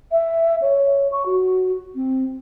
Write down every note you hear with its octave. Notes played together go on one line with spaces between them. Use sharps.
E5
C#5
C#6
F#4
C4